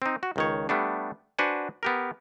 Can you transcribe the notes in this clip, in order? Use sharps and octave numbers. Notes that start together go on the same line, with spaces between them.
C4 D#4
F#4
C#2 D#3 C#5
G3 A3 B3 D4
D4 F#4 B4 C5 F#5 G#5
B3 G4 A#4